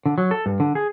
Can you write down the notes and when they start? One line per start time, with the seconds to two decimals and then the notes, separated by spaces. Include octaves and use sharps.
0.06 D3
0.18 F#3
0.31 A4
0.46 G2
0.60 D3
0.75 G#4